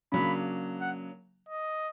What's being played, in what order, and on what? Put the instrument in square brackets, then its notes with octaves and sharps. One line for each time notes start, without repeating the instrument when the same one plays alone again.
[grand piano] C#3 F#3 A#3 D4 [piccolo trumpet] B5
[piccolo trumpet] F#5
D#5